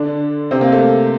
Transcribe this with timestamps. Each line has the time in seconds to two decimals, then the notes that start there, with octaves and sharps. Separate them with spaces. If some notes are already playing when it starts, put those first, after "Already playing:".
Already playing: D3 D4
0.51 C3 C4
0.61 A#3
0.72 A3